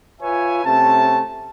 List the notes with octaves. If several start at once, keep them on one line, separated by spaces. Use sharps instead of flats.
F4 B4 C#5 E5 G#5
C3 A3 C#4 A5